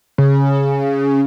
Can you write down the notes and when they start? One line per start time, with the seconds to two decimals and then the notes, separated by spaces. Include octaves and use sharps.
0.18 C#3